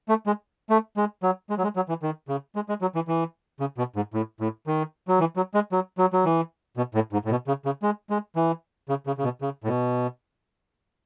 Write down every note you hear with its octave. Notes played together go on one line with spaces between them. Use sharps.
A3
G#3
A3
G#3
F#3
G#3
F#3
G#3
F#3
E3
D#3
C#3
G#3
G#3
F#3
E3
E3
C#3
B2
G#2
A2
A2
D#3
F#3
E3
F#3
G#3
F#3
F#3
F#3
E3
B2
A2
G#2
A2
B2
C#3
C#3
G#3
G#3
E3
C#3
C#3
C#3
B2
C#3
A2
B2